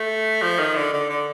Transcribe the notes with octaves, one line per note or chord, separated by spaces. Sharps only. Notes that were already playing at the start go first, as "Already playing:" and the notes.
Already playing: A3
F3
D#3
D3
D3
D3